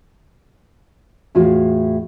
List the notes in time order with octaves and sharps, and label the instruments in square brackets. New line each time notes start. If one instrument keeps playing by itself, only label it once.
[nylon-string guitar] E2 A2 F4 F#4